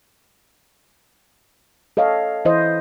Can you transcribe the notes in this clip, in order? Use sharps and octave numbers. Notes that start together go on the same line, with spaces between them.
A4 C#5 D#5 F5
E3 E4 C5 D#5